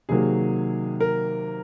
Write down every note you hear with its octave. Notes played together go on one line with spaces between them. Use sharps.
C3 D#3 F#3 A#3 G#4
A#4